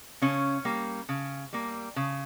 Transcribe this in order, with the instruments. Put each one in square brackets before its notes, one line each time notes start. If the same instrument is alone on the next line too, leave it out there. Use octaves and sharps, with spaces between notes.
[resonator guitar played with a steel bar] C#3 C#4
G3 A#3
C#3
G3 A#3
C#3